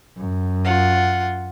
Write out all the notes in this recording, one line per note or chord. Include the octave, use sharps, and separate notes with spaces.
F#2
F4 F#5